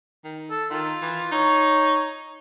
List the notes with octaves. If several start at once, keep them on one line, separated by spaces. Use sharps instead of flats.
D#3
A4
D#3 F4
E3
D#4 C#5